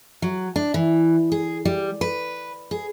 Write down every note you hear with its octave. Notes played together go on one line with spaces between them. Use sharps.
F#3
D4
E3
G#4
G3
B4
G#4